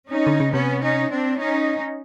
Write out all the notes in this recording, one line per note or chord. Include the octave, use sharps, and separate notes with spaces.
C#4 D#4
D3
C#3
C3 B3 C#4
C#4 D#4
C4 D4
C#4 D#4